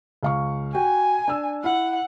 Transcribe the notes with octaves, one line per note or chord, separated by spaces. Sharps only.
C#2 F5 C#6
F#4 G5 G#5
D4 E6
E4 F#5